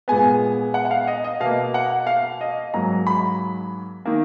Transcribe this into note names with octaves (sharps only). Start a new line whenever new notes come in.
A#2 G#3 B3 G#5
F#5
F#5
F5
D#5
D#5
B2 A#3 F5
F#5
F5
D#5
G#2 F#3 A#3 A#5
B5
D#3 A#3